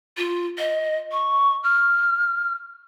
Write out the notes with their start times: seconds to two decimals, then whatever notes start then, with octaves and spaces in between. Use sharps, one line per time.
0.17 F4
0.58 D#5
1.12 C#6
1.63 F6